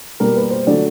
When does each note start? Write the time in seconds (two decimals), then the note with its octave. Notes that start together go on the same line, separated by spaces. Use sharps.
0.20 B2 G3 A#3 A#4
0.36 B4
0.51 C5
0.67 D3 F#3 A3 D5